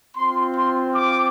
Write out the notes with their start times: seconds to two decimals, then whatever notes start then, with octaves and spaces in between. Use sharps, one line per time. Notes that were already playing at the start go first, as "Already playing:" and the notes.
0.15 C4 F4 C6
0.56 C6
0.95 D6